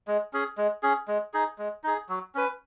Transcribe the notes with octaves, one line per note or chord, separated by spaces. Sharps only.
G#3
C#4 G#4
G#3
C#4 G#4
G#3
D#4 G#4
G#3
D#4 G#4
F#3
C#4 B4